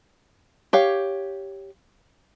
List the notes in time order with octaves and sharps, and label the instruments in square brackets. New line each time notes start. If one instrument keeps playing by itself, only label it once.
[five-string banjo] G4 C#5 F5